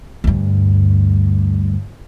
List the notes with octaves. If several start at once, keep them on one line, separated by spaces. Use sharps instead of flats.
D2 G2